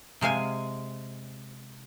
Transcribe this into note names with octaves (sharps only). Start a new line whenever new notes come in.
C3 G#3 F5 G#5